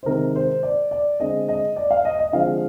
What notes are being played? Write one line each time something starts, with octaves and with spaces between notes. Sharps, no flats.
C5
C3 D#3 G#3 C4 A#4
C5
D5
D5
D3 G#3 C4 D#5
D#5
D5
F5
D#5
D#5
D3 F3 G#3 C4 F5